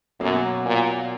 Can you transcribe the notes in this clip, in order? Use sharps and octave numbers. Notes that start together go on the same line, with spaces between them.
F#2 B2 F#3 A#3
A#2